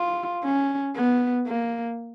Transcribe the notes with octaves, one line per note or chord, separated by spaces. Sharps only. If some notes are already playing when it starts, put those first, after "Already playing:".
Already playing: F4
C#4
B3
A#3